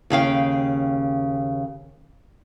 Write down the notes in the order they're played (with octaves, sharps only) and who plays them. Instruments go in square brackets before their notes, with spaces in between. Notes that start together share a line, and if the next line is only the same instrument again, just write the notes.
[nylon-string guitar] D#2 C#3 F5 G5